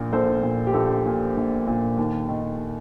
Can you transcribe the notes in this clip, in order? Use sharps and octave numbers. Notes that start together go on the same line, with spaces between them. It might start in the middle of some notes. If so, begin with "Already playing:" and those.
Already playing: A#1 A#2
A#1 A4 C5
A#2
G4
A#1 A4
A#2
A#1
A#2
D#2
D#3